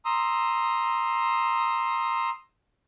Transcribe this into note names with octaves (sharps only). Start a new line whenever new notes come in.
A#5 C6 D#6 E6